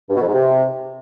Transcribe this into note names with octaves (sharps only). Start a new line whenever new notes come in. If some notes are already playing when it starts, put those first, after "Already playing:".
G2
B2
F2
G#2
C3